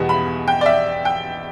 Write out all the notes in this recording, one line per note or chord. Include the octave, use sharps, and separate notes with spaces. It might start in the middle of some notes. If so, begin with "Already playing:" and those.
Already playing: E2 B2 G3 B3
B5
G5
D5
E5
G5